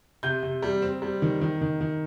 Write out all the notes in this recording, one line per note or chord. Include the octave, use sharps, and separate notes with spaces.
C3 G6
C3
G3
C4
G3
D#3
D#3
D#3
D#3